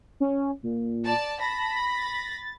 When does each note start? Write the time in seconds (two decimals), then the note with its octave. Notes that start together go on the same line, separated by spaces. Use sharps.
0.20 C#4
0.63 A#2
1.04 D5 A5
1.41 A5 B5 A#6
1.97 A6